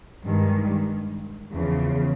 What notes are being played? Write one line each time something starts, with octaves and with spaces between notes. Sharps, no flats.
G2 D#3 G#3
E2 C#3 F3